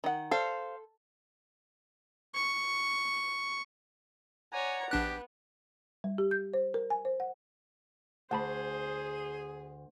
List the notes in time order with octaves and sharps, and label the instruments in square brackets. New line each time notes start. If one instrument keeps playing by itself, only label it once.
[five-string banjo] D#3 F#5
[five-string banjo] A4 [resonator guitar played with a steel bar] C5 F5
[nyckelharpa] C#6
[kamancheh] C#5 A#5 [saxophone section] D5 F#5 [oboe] G#5
[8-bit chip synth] A#1 D4 F#6 [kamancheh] B3 [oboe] G4
[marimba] G3
G4
G6
C5
A#4
G#5
C5
F#5
[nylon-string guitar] D2 [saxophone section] G#4 [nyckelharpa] C5 [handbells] F#5 A5 B5